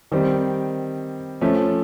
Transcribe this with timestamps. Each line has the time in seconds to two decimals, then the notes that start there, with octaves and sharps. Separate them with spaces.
0.12 D#3 G3 C4
1.41 F3 A3 C#4